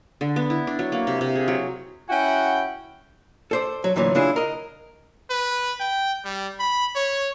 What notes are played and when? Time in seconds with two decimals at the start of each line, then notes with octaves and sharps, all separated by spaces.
0.21 D3
0.36 B3
0.50 E4
0.67 D4
0.79 F#3
0.92 A#3
1.07 C3
1.21 C3
1.36 G#4
1.48 F#3
2.09 C#4 E4 F#4 F#5 G5
3.51 A4 C5 D5
3.84 F#3
3.96 D2 A#2 E3 F#3
4.15 C#3 D4 E4 F4 G#4
4.36 A#4 D#5
5.30 B4
5.80 G5
6.25 G3
6.60 B5
6.96 C#5